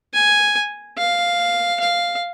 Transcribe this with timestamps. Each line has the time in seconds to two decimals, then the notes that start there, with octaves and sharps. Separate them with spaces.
0.14 G#5
0.97 F5
1.80 F5